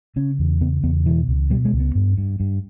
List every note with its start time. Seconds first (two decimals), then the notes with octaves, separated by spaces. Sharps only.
0.16 C#3 C#4
0.39 E2
0.61 C#3 B3
0.83 E2 B3
1.05 B2 E3
1.28 C#2
1.50 B2 G3
1.65 G#3
1.73 C#2
1.80 B3
1.95 G2
2.17 G2
2.40 G2